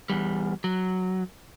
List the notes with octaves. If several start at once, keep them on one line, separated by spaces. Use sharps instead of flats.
E2 G3
F#3